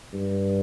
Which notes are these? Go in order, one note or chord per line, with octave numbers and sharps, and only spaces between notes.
G2